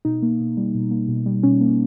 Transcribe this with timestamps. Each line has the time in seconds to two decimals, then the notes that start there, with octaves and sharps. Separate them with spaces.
0.05 B2 D#4
0.22 A#3
0.40 B2
0.57 G3
0.75 B2
0.91 A#3
1.08 B2
1.26 G3
1.43 B2 C#4
1.61 A#3